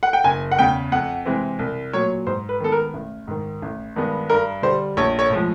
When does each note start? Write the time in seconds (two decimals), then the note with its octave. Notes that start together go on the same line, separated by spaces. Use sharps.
0.03 F#5
0.13 G5
0.24 F#1 G#5
0.51 F#5
0.59 E2 C#3 G5
0.92 F2 F#5
1.25 C3 E3 G#3 C4
1.59 C2
1.93 A#2 F#3 C#5
2.26 G#2 C5
2.49 B4
2.60 D#3 G#3 B3 A4
2.72 A#4
2.94 A1
3.27 G#2 D#3
3.62 A1
3.96 G2 D#3 G#3 B3
4.30 G2 A#4
4.62 D3 G3 C5
4.97 A#1 C#5
5.19 C#5
5.30 A2 F3 G#3